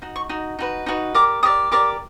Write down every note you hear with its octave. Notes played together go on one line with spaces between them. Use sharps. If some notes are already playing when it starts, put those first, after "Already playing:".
D#4 F#4
C#6
D#4 F#4
D#4 F#4 B4
D#4 F#4 B4
G4 A#4 D5 D6
G4 A#4 D5 D#6
G4 A#4 D5 D6